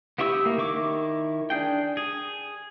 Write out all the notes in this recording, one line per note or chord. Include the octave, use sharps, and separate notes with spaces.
B3 E4 G4 C#6 E6
A#3
D#3 E4 C#6 D6
D4 G#4 G5
G#4